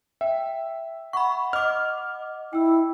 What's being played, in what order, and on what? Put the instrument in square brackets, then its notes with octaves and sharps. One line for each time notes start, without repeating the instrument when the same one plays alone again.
[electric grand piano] E5 [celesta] G5
[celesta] F#5 [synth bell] B5 C#6
[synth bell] D#5 D6 [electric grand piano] F6
[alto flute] E4 [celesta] G5 E6